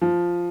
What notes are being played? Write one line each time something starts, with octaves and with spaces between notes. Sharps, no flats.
F3